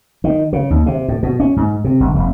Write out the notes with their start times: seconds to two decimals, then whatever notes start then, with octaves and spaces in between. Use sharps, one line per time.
0.24 D#3
0.53 C#3
0.70 D#2
0.86 C3
1.08 A2
1.23 B2
1.40 C#4
1.56 G#2
1.84 C3
2.00 G1
2.15 F1